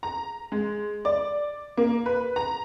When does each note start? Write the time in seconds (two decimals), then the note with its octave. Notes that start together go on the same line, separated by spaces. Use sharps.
0.03 A#5
0.52 G#3
1.05 D5
1.77 A#3
2.06 B4
2.36 A#5